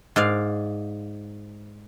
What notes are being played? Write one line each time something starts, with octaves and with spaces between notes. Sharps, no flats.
G#2 D5 F5